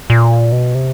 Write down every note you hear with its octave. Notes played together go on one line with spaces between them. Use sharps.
A#2
B2
C3